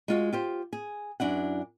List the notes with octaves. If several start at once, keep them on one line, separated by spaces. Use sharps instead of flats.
G#3 F4 F#4
F4 G4 C5
G#4
F#2 D4 E4 F#5